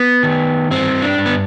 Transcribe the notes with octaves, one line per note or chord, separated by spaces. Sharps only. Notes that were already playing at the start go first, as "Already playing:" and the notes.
Already playing: B3
D#3
G2 C4
D4
G2
B3